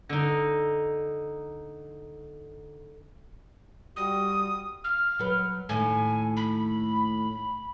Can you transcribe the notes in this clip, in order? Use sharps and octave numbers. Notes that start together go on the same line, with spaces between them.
D3 D#4
G3 F#4 D#6
F6
F#3 B4
D#2 A2 G#5
B5